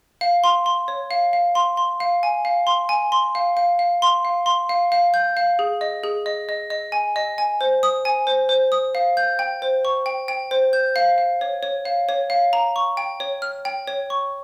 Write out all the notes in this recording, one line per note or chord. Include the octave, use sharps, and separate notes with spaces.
F5
C6
C6
C#5
F5
F5
C6
C6
F5
G#5
F5
C6
G#5
C6
F5
F5
F5
C6
F5
C6
F5
F5
G6
F5
G#4
D#5
G#4
D#5
D#5
D#5
G#5
D#5
G#5
C5
D#6
G#5
C5
C5
D#6
F5
G6
G5
C5
C#6
G5
G5
C5
G6
F5
F5
C#5
C#5
F5
C#5
F5
A#5
C#6
G5
C#5
F6
G5
C#5
C#6